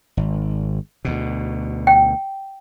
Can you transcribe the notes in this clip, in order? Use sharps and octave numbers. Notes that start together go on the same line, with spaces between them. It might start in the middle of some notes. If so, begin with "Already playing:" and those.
G#1
D2 B2
G5